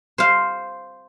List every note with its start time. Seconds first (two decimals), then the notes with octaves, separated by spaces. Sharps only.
0.18 C5 F5